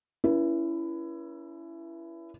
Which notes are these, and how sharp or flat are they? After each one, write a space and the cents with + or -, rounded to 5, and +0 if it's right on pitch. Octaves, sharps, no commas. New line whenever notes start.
C#4 +35 E4 +20 B4 -40